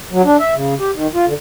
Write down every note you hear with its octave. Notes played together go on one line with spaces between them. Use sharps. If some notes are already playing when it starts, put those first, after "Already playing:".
F#3
D4
E5
C#3
G4
D#3
F4
D3